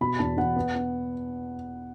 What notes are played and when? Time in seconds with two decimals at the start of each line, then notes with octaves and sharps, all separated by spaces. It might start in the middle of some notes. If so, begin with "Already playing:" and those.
0.01 B2 B5
0.19 E2 A5
0.37 E2 F#5
0.56 B3
0.75 B3